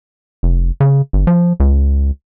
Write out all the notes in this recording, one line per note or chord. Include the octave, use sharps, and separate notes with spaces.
F1
C#3
G1
F3
C#2